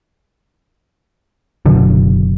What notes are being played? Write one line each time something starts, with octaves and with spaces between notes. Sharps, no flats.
F#1 B2 D3 F#3